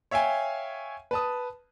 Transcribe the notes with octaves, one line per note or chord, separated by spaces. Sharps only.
C#5 E5 F5 G5 G#5
B4 A5 D#6